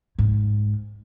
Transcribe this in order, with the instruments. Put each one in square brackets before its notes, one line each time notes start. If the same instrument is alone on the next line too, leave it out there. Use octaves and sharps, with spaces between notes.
[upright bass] G#2